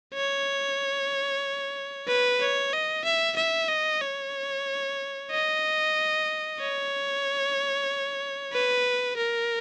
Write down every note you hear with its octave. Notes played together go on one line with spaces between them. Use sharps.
C#5
B4
C#5
D#5
E5
E5
D#5
C#5
D#5
C#5
B4
A#4